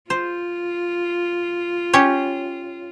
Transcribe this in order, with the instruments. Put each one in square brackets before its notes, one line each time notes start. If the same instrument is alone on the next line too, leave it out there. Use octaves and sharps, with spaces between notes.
[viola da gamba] F4 [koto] C5
[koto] C#4 G4 C#5